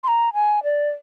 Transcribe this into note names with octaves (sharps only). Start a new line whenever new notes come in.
C6
A#5
G#5
D5